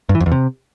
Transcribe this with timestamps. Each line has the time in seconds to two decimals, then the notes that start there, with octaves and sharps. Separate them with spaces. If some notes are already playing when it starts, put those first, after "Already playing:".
0.09 G2
0.15 E3
0.20 F2
0.26 E2
0.32 C3